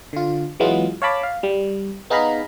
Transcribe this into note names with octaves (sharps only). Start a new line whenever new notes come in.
D3 F4
E3 F#3 G#3 B3 F4
C#5 F5 A5 B5 D6
F5
G3
B3 D#4 G#4 F5 A#5 B5